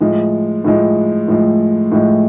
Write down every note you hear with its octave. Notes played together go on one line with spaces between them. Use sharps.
A2 F3 G#3
A2 F3 G#3
A2 F3 G#3
A2 F3 G#3